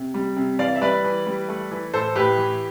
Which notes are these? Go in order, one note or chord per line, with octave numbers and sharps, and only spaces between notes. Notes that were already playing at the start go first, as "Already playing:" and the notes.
Already playing: C3
G3
C3
E3 D5 F5
E5
G3 B4 D5
E3
G3
A3
E3
A2 A4 C5
A2 G4 B4
E3